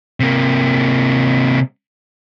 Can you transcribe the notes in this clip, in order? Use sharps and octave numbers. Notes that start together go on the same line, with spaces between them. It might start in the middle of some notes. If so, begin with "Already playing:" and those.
C3 A#3